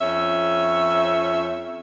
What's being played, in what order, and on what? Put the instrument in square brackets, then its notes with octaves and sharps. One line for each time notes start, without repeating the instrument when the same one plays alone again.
[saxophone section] F2 C#4 E5